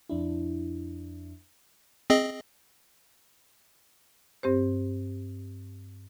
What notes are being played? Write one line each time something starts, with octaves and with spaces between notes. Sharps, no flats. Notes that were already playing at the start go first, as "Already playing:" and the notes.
F2 D4 E4
C4 G#4 D#5
G2 C4 G4 C5